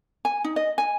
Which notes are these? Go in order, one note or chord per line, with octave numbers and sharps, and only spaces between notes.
G#5
D#4
D#5
G#5